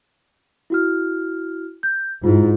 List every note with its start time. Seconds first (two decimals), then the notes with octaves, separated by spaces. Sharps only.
0.70 E4 F#4 F6
1.83 G6
2.24 G#2 E4 F4